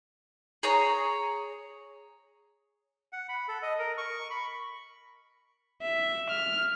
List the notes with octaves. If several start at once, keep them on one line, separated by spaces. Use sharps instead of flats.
G#4 C#5 A#5
F#5
B5
A4
D#5
A#4
C#6
B5
E5
F6